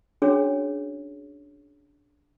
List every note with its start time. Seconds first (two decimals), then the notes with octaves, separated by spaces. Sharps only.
0.22 C#4 D4 F#4 G#4 C#5